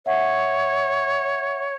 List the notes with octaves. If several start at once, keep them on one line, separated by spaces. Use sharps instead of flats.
C#5 E5 F#5